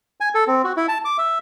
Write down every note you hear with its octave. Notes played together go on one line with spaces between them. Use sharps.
G#5
A4
C4
F#4
E4
A5
D6
E5